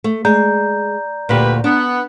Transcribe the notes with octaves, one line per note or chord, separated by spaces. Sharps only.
A3
G#3 D5 A#5 G6
D2 A#2 G3 B4
B3 D4